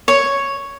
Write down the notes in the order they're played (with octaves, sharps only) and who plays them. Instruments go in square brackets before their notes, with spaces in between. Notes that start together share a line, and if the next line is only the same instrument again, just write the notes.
[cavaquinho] C#5